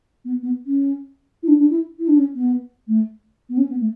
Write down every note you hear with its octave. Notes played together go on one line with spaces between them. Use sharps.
B3
B3
C#4
E4
D4
D4
E4
E4
D4
C#4
B3
A3
B3
C#4
B3
A3